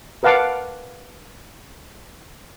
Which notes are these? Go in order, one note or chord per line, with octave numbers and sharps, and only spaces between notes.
A#4 B4 F5 F#5 A5 D6